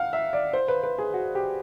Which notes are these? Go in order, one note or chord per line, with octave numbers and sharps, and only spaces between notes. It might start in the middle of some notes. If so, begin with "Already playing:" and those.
Already playing: F5 F#5
E5
D5
C5
B4
B4
G#4
F#4
G4